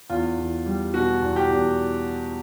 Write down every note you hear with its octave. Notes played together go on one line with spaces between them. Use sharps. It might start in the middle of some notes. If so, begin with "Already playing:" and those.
E2 F4
E2
G3
B2 F#4
E2
G4
E2